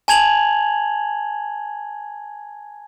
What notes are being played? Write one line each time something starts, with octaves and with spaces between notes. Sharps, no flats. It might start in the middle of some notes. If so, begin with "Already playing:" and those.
G#5 A5 G#6 F7 F#7